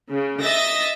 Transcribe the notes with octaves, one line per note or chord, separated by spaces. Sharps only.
C#3
D#5 E5 E6 A6 A#6